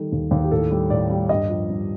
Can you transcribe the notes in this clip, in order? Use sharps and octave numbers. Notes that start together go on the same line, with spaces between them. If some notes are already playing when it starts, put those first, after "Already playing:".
Already playing: D#3 G3 A4
D#2
D#2
G4
A2 A4
G3
A2 D5
G3
G2 D#5
F3
G2